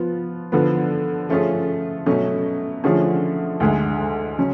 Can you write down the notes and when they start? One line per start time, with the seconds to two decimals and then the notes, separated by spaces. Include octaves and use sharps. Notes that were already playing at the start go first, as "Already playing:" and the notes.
Already playing: F3 B3 F4
0.52 D3 F3 B3
1.29 F3 A3 C#4 F4 G#4
2.06 B2 F#3 A3 C#4
2.84 D3 F3 A3 C#4 G#4
3.60 D2 D3 G#3
4.38 C#3 F#3 C#4